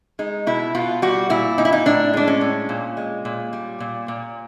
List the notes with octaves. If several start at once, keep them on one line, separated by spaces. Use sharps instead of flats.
G#3 D#4
B2 E4
B2 F4
G3 F#4
A#2 E4
A#2 D#4
E4
D#4
A2 D4
G#3 D4
C#4
A2
A#2
G#3
A#2
G3
A#2
A#2